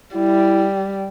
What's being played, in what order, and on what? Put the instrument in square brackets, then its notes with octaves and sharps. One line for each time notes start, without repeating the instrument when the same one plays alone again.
[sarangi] G3 [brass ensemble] E4